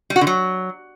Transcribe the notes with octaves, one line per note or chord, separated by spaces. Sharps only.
G3
F#4
D3
F#3